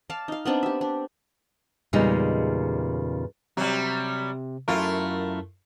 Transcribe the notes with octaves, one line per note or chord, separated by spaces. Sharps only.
D5 F5 A5
D#4 F5
B3 C4 D4 D#4
G4 E5
D4
E2 A#2 C#3 G3 G#3 D#4
C3 F#3 G3
F#2 A3 E4 F4 A#4